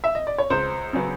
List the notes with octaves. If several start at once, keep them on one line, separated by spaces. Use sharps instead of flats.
E5
D#5
D5
C#5
C#2 C5
C#3 F#3 B3